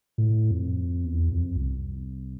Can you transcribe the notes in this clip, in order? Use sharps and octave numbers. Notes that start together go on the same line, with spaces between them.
A2
F2
E2
F2
C2